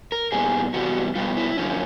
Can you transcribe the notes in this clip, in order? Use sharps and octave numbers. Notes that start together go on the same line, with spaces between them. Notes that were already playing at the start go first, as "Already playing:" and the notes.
A#4
A#2 G3 B3 G#4
C3 E3 G3 B3 F#4
B2 G3 B3 F4
E4
F#2 D3 F3 A#3 C#4